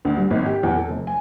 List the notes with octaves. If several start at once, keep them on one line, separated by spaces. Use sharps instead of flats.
D2
G3
G#1
G4
E2
A4
F1
G#5